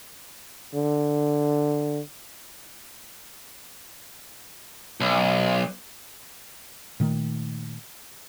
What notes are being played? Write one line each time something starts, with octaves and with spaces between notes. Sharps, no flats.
D3
B1
A#2 D#3 A3